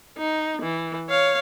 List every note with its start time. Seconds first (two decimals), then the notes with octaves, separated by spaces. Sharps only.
0.18 D#4
0.62 E3
1.10 C#5 F5